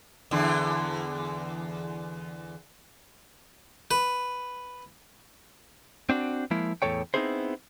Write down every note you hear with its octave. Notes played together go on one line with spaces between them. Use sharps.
E2 D3 E4
B4
C4 D4 F#4
F3 G#3 A#3 E4
E2 A2 A3 A4 C#5 G5
B3 C4 D#4 E4 G#4 C5